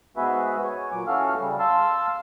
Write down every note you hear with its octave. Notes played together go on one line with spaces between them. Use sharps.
G#2 B3 F#4 G#4 B4 E5
C#5 G#5
A#2 F#3 D6
E3 C#4 F#4 A4 F5 F6
C#3 G3
F5 A5 C6 E6